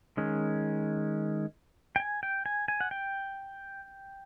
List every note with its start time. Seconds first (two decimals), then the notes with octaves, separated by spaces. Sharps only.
0.17 D#3 G#3 C#4
1.96 G5
2.00 G#5
2.23 G5
2.46 G#5
2.68 G#5
2.81 F#5
2.91 G5